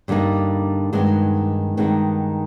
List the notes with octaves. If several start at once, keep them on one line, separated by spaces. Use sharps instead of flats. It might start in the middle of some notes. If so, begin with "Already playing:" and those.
G2 D3 G3 A#3 D#4
G2 D#3 G#3 B3 D#4
G2 D#3 G#3 B3 D#4